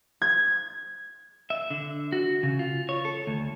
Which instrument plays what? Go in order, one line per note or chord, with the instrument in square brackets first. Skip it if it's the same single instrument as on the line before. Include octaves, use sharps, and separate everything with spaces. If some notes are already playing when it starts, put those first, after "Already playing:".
[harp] G#6
[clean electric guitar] E5
D3
F#4
C#3
F4
C#5
A4
D2